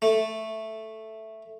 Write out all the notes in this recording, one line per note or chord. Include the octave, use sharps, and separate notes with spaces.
A3